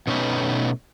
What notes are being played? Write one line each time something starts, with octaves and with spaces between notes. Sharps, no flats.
B2 A3 C#4 D#4 B4